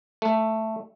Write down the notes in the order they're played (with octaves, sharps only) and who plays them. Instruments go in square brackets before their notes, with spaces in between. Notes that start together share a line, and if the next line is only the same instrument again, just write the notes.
[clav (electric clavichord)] A3